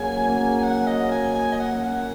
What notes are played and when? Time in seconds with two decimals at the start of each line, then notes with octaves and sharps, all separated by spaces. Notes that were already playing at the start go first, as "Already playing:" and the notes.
Already playing: F#3 A#3 C#4 G#4 G#5
0.26 A#3 C#4 G#4
0.62 F#3 F#5
0.87 D#5
1.00 A#3 C#4
1.11 G#5
1.35 F#3 G#5
1.52 D#5
1.60 F#5
1.72 A#3 C#4
1.84 F#5